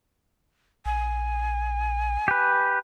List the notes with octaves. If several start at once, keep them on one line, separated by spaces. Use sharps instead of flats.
A#1 G#5
G4 B4